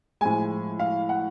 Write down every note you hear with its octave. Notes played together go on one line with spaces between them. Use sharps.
A2 F3 G#3 G#5
F5
F#5